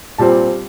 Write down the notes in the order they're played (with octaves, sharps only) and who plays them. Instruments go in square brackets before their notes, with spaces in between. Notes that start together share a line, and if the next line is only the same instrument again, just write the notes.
[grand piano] A#2 G3 C4 A5